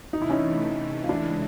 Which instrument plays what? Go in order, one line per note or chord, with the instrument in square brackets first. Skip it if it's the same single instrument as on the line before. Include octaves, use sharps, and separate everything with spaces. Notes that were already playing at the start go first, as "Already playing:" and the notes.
[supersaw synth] C3 E3 A3 [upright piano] D#4
[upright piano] E4
C#4 D#4
F4
[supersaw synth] C#3 E3 G#3 [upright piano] D4 E4